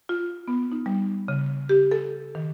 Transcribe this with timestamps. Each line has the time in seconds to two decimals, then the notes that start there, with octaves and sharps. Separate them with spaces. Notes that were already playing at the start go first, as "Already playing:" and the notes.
0.09 F4
0.48 B3
0.72 D#4
0.86 G3
1.28 C#3
1.69 G4
1.91 A4
2.35 D#3